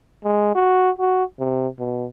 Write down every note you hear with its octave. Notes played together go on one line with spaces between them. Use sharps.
G#3
F#4
F#4
C3
B2